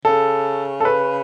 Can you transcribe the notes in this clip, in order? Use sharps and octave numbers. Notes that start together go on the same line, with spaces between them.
C#3 A4
A4
B4